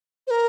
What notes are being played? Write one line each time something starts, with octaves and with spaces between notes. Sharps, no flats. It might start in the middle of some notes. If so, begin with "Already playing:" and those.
C5
A#4